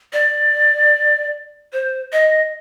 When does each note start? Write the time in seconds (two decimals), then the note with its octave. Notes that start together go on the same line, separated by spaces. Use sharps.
0.13 D5
1.73 C5
2.12 D#5